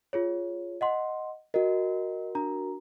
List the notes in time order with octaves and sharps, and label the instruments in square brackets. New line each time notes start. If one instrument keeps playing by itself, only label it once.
[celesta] F4 G#4 C#5
D#5 F#5 C6
[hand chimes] F#4 A#4 [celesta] D#5
[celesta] D4 A#5